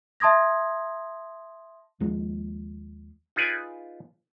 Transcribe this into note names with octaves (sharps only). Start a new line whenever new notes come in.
E5 A5 C6 D#6 G#6 A#6
D#2 F3 G#3
D#4 F4 G#4 B4 D5 G#5